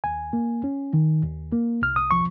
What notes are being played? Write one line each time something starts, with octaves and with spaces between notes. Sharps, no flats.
D#2 G#5
A#3
C#4
D#3
D#2
A#3
C2 F6
D#6
F3 C#6